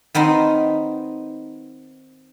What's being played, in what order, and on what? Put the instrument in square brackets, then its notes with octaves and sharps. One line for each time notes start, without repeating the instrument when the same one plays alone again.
[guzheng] D#3 B3 C4 D#4